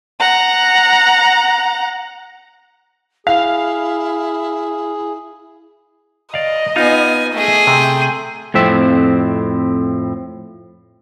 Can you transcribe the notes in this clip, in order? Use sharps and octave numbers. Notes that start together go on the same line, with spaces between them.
F#5 A#5
E4 G#4 F5
D5 D#5 F5
B3 D#4 F4 F5 G#5
A3 G#4 D#5
C3 G5
F2 A2 C4 E5